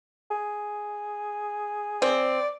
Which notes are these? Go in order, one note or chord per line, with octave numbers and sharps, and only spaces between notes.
G#4
C4 D5